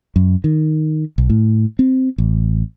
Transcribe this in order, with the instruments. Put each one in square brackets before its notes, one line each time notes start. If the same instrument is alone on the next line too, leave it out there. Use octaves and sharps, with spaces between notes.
[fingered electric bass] F#2
D#3
B1
A2
C4
A1